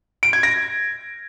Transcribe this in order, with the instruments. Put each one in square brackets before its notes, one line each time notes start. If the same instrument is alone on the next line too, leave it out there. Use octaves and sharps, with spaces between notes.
[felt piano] D7
G#6
A#6